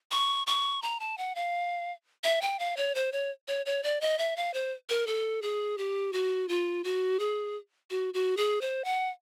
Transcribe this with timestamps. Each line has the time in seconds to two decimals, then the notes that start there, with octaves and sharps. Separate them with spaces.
0.11 C#6
0.47 C#6
0.82 A#5
1.00 A5
1.18 F#5
1.35 F5
2.24 E5
2.41 G5
2.59 F5
2.77 C#5
2.95 C5
3.12 C#5
3.48 C#5
3.66 C#5
3.83 D5
4.01 D#5
4.19 E5
4.37 F5
4.54 C5
4.89 A#4
5.07 A4
5.42 G#4
5.78 G4
6.13 F#4
6.49 F4
6.84 F#4
7.19 G#4
7.90 F#4
8.14 F#4
8.37 G#4
8.61 C5
8.84 F#5